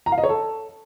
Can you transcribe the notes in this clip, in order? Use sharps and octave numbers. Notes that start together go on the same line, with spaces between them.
A#5
F5
D#5
C#5
A4